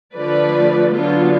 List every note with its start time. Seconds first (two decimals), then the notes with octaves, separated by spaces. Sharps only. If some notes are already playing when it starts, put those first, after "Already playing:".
0.15 D3 F3 A3 B4 D5
0.92 D3 F#3 B3 D4 F4